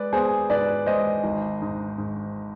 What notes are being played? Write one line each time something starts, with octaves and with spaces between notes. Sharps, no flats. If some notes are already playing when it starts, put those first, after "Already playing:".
Already playing: G#3 B4 D5
B3 G#4 C5
G#2 B4 D5
G#3 C5 D#5
G#1
G#2
G#2